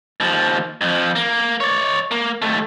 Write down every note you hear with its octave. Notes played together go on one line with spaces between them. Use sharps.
D#2 F3
F2 F3
A#3
C#5 D5
A#3
D#2 A3